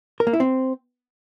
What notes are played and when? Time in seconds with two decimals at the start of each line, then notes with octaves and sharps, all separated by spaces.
0.20 A#4
0.27 A#3
0.33 E4
0.40 C4